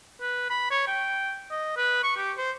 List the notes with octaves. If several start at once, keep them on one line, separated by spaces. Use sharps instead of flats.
B4
B5
C#5
G5
D#5
B4
C#6
G4
C5